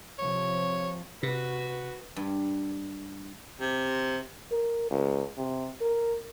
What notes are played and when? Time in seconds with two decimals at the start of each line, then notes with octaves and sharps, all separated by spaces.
0.19 C3 F3 C#5
1.23 C3 F#4 B4
2.16 G2
3.60 C3
4.51 A#4
4.90 C#2
5.37 C3
5.81 A#4